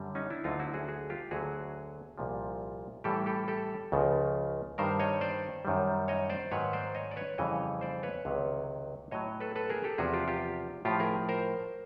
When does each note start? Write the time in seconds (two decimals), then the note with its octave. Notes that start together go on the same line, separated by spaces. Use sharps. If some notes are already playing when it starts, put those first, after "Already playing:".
Already playing: F#2 D3 G3
0.15 C#4 D#4
0.30 D4 E4
0.44 D2 D3 F#3 D#4 F4
0.59 E4 F#4
0.74 F#4 G#4
0.88 F#4 G#4
1.10 F4 G4
1.31 D2 D3 F#3 F#4 G#4
2.18 C2 A#2 F3
3.04 A2 E3 G3 G4 A4
3.26 G4 A4
3.48 G4 A4
3.92 C#2 C#3 F3
4.78 G2 D#3 G3 A#4 C5
5.00 C#5 D#5
5.21 C5 D5
5.65 F#2 D#3 G3
6.08 C#5 D#5
6.30 C5 D5
6.51 G#2 D#3 F#3 B4 C#5
6.73 C5 D5
6.95 C#5 D#5
7.11 D5
7.16 B4 C#5
7.38 F2 C#3 E3 G3 C#5 D#5
7.81 C5 D5
8.03 B4 C#5
8.25 C#2 C3 D#3 F#3
9.11 A2 F#3 C#5 D#5
9.40 A4 B4
9.56 A4 B4
9.70 G#4 A#4
9.84 G4 A4
9.98 E2 C3 F3 F#4 G#4
10.14 F4 G4
10.28 F4 G4
10.85 A2 F3 F4 G4
10.99 G#4 A#4
11.29 A#4 C5